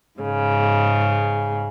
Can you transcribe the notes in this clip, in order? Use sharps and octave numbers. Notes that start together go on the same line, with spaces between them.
G#2 C#3